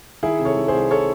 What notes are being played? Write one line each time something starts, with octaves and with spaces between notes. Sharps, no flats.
D#3 E4 G#4
C3
A4 C#5
D#3
G#4 C5
C2
A4 C#5